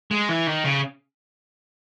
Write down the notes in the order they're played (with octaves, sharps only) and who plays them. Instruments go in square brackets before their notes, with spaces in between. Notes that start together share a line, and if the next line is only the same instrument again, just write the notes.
[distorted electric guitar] G#3
E3
D#3
C#3